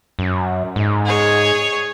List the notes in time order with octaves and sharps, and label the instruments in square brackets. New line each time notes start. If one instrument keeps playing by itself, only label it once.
[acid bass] F#2
G#2
[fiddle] G#4 C#5